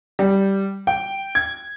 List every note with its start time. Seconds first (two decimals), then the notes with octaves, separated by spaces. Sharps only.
0.19 G3
0.87 G5
1.35 G#6